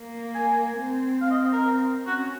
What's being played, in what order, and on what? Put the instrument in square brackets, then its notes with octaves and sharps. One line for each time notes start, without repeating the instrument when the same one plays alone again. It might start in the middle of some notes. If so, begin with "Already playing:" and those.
Already playing: [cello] A#3
[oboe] G#5
[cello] C4
[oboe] F5
D#5
A#4
[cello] C4
[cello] C#4 [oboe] F#4